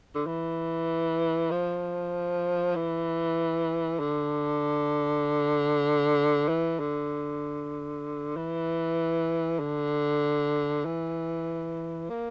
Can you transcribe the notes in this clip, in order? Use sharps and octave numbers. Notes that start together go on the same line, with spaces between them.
D3
E3
F3
E3
D3
E3
D3
E3
D3
E3
A#3